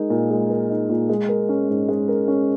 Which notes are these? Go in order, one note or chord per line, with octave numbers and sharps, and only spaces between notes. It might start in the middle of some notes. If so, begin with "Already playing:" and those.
Already playing: G#3 D#4 A#4
A#2
G#3
A#4
D#4
A#2
G#3
A#4
C#4
G#2
G#3
A#4
C#4